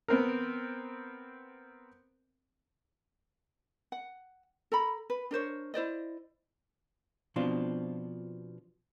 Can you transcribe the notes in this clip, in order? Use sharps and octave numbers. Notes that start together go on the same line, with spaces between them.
B3 C4 A#4
F#5
A4 A#5 B5
B4
D4 A#4 C5 C#5
E4 C5 D5 D#5
B2 F3 C4 D4 F4